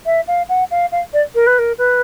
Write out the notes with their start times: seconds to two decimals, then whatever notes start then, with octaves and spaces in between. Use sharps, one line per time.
0.06 E5
0.27 F5
0.49 F#5
0.71 F5
0.92 F5
1.13 D5
1.35 A#4
1.47 B4
1.59 A#4
1.78 B4